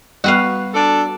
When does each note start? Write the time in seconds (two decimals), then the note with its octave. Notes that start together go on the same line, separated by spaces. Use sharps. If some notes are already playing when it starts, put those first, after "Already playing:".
0.24 G3 B3 F#4 B4 F5
0.75 D4 A4